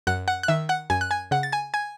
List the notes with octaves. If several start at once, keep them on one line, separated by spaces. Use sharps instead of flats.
F#2 F#5 F#6
F#5 F#6
F#6
D#3 E5 E6
F#5 F#6
F#2 G#5 G#6
F#6
G#5 G#6
C#3 F#5 F#6
A6
G#5 G#6
G#5 G#6